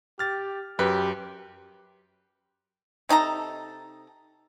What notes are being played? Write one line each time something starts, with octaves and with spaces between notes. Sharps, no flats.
G4 F6 A6
F#2 G4 B4
C3 D#4 A4 A#5